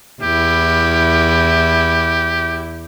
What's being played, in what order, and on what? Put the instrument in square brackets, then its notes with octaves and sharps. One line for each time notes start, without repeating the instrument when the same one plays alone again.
[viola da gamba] E2 E4 [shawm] G4